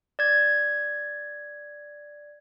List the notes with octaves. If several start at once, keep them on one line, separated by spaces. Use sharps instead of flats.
D5 G#6